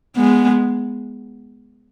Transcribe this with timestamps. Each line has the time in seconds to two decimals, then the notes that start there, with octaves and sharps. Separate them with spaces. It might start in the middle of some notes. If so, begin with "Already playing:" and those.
0.16 G#3 B3